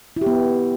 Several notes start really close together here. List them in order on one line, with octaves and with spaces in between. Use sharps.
E4 G4 B3